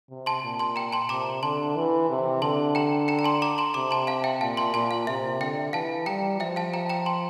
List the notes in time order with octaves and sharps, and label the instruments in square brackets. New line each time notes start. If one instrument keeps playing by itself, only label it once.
[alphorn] C3
[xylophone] A5 C6
[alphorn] A#2
[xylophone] A5 C6
G5 A#5
A5 C6
[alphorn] C3 [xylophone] A#5 D6
[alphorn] D3 [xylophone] A5 C6
[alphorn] E3
C3
[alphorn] D3 [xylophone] A5 C6
[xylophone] G5 A#5
G5 A#5
A#5
A5 C6
A#5 D6
A5 C6
[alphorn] C3 [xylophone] A#5 D6
[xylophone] A5 C6
F5 A5
E5 G5
[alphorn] A#2 [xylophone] F5 A5
[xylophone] A5 C6
[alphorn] A#2 [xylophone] A5 C6
[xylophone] F5
[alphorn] C3 [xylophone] E5
[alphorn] D3 [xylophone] E5 G5
[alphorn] E3 [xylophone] F5 A5
[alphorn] G3 [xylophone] G5 A#5
[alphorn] F3 [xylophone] E5 G5
[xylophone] F5 A5
G5 A#5
G5 A#5
A5 C6